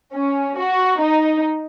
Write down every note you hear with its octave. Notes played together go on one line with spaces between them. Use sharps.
C#4
F#4
D#4